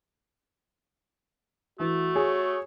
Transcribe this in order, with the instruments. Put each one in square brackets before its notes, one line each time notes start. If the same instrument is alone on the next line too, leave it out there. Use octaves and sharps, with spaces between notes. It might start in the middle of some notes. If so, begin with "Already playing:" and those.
[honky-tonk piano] E3 [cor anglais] A3 [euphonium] F#4
[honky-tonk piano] G#4 [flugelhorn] C#5